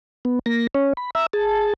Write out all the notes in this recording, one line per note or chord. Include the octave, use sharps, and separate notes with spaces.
B3
A#3 A#6
C#4 C#5
B5
E5 A#5 E6
G#4 A5